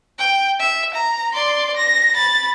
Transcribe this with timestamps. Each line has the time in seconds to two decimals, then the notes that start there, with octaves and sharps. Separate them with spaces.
0.19 G5
0.59 E5
0.95 A#5
1.34 D5 C6
1.77 A#6
2.14 B5 A6